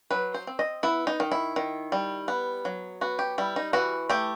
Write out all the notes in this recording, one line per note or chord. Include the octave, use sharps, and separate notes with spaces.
F#3 B4
C5
C4
D#5
B3 E4
D#4
D#3
E4
D#3
G3
B3
F#3
B3 F#4
G4
G3 E4
D#4
E3 F#4
A3 G4